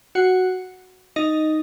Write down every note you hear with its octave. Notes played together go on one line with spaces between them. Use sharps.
F#4 F#5
D#4 D#5